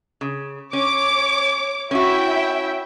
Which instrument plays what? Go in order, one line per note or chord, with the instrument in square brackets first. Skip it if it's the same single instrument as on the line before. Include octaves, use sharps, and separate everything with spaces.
[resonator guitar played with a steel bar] C#3
[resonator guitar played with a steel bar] C#4 [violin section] C#5 D6
[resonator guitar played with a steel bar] C#4 F#4 [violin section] E4 E5 G5